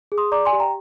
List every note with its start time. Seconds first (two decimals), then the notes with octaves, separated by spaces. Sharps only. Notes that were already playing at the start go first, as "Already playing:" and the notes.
0.12 G#4
0.18 C6 D#6
0.32 D5 A#5 D6
0.45 G#5 C6
0.53 G4
0.60 G5 A#5